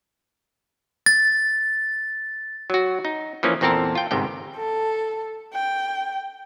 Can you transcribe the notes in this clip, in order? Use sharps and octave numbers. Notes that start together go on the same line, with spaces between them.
A6
F#3 F#4
D#4
E3 F3 A#3 C#4
E2 A#2 C4 A4 A#4 A5
F4 G5
G1 G#2 C3 G5
A4
G5